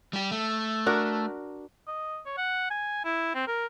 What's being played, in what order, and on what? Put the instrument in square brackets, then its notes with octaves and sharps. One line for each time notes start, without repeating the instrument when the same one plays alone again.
[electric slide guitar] G3 G4
A3
[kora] D4 F#4 A#4
[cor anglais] D#5
C#5
F#5
G#5
E4
C4
A#4